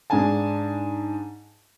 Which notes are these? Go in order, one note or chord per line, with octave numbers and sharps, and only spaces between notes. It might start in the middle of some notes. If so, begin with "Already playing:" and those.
G#2 D4 G#4 G#5 A5